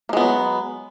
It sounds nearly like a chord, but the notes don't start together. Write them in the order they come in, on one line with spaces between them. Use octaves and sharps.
A#3 G#3 B3 F#3